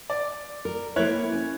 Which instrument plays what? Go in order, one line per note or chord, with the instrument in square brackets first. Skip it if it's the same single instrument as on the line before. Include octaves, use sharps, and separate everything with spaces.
[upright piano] D5
[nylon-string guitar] A#4
[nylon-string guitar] A#3 C4 E4 [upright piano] C#5 F#6 G#6
[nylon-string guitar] C#4